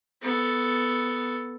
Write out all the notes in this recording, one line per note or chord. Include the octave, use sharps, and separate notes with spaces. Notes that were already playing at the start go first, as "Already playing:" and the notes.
B3 A4